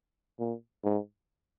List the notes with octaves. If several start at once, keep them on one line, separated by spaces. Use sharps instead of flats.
A#2
G#2